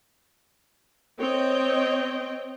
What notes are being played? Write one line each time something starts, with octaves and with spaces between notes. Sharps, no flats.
C4 C#5 D#5 G5